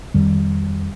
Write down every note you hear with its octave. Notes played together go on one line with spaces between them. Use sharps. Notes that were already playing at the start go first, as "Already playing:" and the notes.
F2 D#3 G3